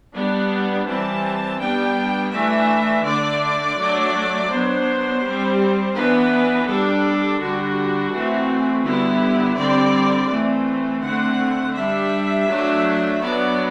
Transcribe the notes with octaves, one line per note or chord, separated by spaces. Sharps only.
G3 B3 D4
E3 G3 C4 A5
G3 B3 D4 G5
E3 A3 D4 E5
D3 A3 D4 D5
F#3 A3 D4
F#3 B3 D4 C5
G3 C4
E3 B3 D4 B4
G3 D4 A4
D3 G3 D4 F#4
E3 A3 C4
D3 G3 B3 E4
D3 G3 C4 D5
E3 A3 C4
D3 A3 C4 F#5
G3 D4 E5
F#3 A3 D4
F#3 B3 D4 D5